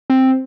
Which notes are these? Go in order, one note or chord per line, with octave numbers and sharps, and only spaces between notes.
C4